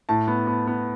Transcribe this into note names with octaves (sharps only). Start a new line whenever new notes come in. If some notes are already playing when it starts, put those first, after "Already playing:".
A2 A5
B3
B3
B3